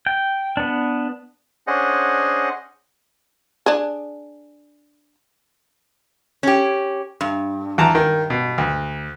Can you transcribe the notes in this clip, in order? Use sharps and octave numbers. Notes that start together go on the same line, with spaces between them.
G5
B3 D4
C#4 D4 G#4 C5 D#5 F#5
D4 G#4
C#4 G4
G2
E2 A5 A#5
D#3
B2
D2